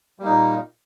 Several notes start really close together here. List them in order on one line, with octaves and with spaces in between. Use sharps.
G3 A#3 D#4 A#2